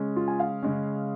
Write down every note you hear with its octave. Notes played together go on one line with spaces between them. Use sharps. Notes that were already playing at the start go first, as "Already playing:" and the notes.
Already playing: C#3 G#3 C#4
F4
G#5
F5
C#3 G#3 C#4